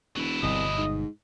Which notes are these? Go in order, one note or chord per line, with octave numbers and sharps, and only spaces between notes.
E1 F#3 E4
G1 C2 B2 D#5
G#2